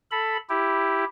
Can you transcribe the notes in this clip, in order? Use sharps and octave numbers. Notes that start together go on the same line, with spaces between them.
A4 B5
E4 G4